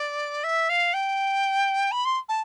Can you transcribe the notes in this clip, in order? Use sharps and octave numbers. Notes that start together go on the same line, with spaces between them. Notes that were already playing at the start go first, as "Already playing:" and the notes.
Already playing: D5
E5
F5
G5
B5
C6
A5